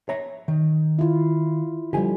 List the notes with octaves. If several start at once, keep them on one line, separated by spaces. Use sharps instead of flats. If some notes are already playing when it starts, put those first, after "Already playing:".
C#5 E5 A#5
D#3
E4 F4
D3 F3 G3 G4 G#5